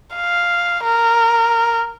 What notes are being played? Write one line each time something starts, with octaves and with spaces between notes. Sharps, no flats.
F5
A#4